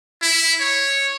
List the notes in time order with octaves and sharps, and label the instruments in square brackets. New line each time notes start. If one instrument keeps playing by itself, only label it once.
[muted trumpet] E4
C#5